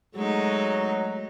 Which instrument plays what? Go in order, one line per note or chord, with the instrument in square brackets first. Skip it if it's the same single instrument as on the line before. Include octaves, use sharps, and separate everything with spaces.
[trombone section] F#3 [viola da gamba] G#3 A3 D#4